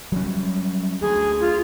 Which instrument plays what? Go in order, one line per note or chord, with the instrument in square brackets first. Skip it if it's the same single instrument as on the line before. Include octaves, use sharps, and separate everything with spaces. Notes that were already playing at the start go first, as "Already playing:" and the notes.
[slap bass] F#3 G3 C#4
[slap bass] D2 [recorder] G#4
[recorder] F4